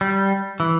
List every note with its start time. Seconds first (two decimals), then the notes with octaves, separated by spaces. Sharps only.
0.01 G3
0.60 E3